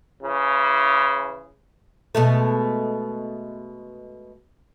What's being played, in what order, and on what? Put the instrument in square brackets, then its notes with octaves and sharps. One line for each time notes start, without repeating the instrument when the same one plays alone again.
[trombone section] C#3 E3
[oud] B2 G#3 A3